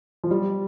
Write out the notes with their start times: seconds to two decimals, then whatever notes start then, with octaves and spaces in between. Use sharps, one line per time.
0.24 F3
0.31 G3